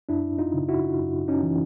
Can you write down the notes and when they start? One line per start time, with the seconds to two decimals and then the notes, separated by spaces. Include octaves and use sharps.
0.09 F#2 D4 E4
0.38 D#4 F4
0.54 C#3
0.69 E4 F#4
0.99 F#2
1.28 C#4 D#4
1.43 E3